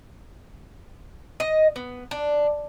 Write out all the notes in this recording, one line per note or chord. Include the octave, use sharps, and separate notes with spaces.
D#5
B3
D4